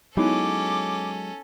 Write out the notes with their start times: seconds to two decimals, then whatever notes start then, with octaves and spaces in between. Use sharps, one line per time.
0.17 F#3 G#3 B3 C#4 D#4 E4 A4 D6